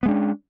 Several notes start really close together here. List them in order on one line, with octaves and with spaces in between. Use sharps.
B3 G#3 D4 C#4